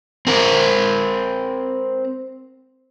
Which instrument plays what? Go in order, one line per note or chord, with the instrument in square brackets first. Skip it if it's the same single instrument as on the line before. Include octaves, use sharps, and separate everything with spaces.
[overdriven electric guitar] C4 A#4